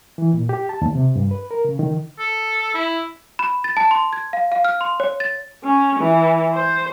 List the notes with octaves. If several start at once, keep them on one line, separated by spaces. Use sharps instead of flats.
E3
A#2
G4
A5
D#2
C3
G2
B4
A#4
C#3
D#3
A4
E4
B5
A6
A5
C6
G#6
F5
F5
F6
C6
C#5
A6
C#4
E3
C5